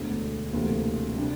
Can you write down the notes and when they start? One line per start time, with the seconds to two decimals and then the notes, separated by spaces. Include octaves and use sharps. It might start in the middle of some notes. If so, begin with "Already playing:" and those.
Already playing: E1 D2 D3
0.53 E1 D2 C3 E3 A#3
1.16 C3 G3 D4